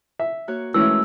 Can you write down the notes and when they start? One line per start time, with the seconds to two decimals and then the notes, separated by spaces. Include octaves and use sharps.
0.19 E5
0.48 A#3 F#4 C#5
0.74 E3 G#3 A3 C#4 E4 A#4 E6